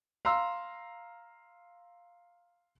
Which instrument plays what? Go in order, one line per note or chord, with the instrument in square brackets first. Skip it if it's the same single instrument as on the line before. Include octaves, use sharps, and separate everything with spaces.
[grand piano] F5 A#5 C6 E6